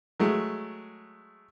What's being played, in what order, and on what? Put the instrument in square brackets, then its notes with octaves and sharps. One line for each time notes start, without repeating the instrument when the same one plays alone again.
[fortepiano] F#3 G#3 A3